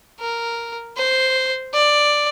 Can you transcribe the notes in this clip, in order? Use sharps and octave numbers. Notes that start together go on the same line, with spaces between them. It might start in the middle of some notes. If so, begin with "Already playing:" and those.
A#4
C5
D5